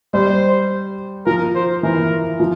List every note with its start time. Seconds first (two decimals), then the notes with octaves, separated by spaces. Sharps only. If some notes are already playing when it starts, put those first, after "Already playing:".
0.13 G3 C5
1.26 F3 A#4
1.55 C5
1.83 E3 A#4
2.40 F3